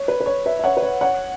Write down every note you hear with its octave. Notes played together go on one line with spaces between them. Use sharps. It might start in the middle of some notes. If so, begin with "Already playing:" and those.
Already playing: C#5
B4
B4
C#5
B4 E5
E5
C#5 F#5
B4
C#5
C#5 F#5